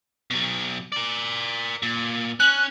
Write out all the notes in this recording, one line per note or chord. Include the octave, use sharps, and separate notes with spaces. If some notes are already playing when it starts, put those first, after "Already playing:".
B2 F#3
A#4 D5
A#2
C#4 F#6